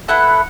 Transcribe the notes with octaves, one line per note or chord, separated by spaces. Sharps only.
B3 E4 A4 F#5